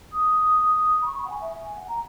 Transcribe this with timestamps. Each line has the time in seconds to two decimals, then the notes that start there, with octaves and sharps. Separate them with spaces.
0.12 D#6
1.02 B5
1.06 C#6
1.17 B5
1.24 F#5
1.29 G#5
1.41 E5
1.64 G#5
1.76 F#5
1.88 A#5